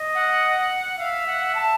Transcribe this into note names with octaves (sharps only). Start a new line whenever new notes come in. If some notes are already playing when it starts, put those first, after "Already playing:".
Already playing: D#5
F#5
E5 F5
F#5
A5